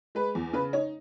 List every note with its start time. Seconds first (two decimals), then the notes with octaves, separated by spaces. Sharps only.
0.15 G#3 B4
0.35 E2
0.53 C#3 B4
0.73 D#4 C#5